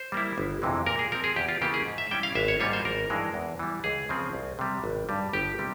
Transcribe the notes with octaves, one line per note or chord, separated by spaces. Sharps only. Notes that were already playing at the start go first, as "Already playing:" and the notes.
Already playing: C5
G3 A#3 E4
G1
F2 C3 E3 G#3
A#2 A#4
G#4
F3 C4 A#4
G#4
E2 G4
F4
C#3 E3 A#3 F4 G4
G#4
G#2
E5
G3 C#4 E4 G5
F5
G#1 E5
C#5
G#2 G3 A#3 F4 C#5
C5
G#1 A#4
G2 E3 G#3
E2
E3 G3
C#2 G#4
C#3 F3 C4
C2
C3 G3
G#1
G2 G3
G1 G4
C3 G3